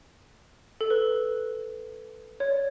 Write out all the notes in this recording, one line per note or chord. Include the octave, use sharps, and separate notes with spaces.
A4
B4
C#5
D5